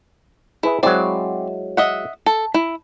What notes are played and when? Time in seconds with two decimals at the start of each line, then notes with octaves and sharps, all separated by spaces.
0.63 E4 G#4 B4 E5
0.83 F#3 G#3 C4 E4 D5
1.77 D#5 E5 F#5
2.26 A4
2.54 E4